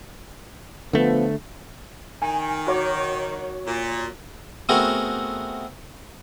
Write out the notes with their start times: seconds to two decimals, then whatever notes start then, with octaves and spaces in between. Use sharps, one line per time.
0.93 D3 F3 A3 B3
2.22 D#3 G#5
2.67 F#4 C#5 D6
3.66 A#2
4.69 A3 B3 C4 F#4 G#4 A#4